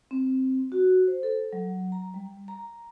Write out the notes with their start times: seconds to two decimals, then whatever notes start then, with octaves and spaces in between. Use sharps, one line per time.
0.11 C4
0.72 F#4
1.07 C5
1.23 A4
1.53 F#3
1.92 A#5
2.14 G3
2.48 A#5